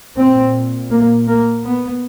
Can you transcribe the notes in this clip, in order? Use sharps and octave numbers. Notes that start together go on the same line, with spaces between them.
A#2 C4
A#3
A#3
B3